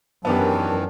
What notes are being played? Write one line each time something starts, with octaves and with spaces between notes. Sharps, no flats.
F#2 D#3 E3 B3 D4 G4 A5